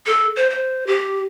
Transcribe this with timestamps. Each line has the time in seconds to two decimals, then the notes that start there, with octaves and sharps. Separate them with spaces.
0.06 A4
0.36 C5
0.50 C5
0.87 G4